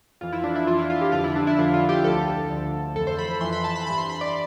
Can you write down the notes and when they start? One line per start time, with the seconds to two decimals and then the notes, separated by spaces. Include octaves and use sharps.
0.21 F2 E3 F4
0.33 E4
0.44 D4
0.55 E4
0.67 F2 E3 F4
0.79 E4
0.90 F4
1.01 G4
1.12 F2 D3 F3 F4
1.24 E4
1.36 D4
1.47 E4
1.58 F2 D3 F3 F4
1.74 F4
1.89 G4
2.04 D2 D3 F3 A4
2.50 D2 D3 F3
2.95 F2 E3 A4
3.07 C5
3.19 B5
3.30 B5
3.41 F2 E3 C6
3.53 B5
3.64 A5
3.76 B5
3.87 G2 E3 B5
3.98 C6
4.10 B5
4.21 D5